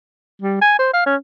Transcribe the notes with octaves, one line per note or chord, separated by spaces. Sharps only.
G3
G#5
C5
F5
C#4